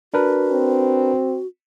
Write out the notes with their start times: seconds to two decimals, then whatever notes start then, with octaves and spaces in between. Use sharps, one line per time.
0.14 D4 F#4 A#4 B4
0.51 C4